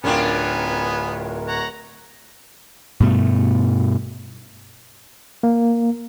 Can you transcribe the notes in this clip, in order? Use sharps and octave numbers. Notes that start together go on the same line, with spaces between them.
D1 B3 C#4 D4 F4 A#4 G5 G#5
C#5 F#5 A#5
G2 B2 A3
A#3